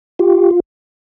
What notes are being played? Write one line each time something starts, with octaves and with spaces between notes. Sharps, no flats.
F4 G4